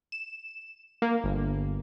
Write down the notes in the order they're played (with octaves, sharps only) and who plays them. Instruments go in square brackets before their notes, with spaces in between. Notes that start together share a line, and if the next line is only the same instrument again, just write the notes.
[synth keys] E7
A#3
G1